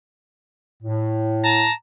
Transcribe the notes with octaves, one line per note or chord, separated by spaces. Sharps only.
A2
A5 A#5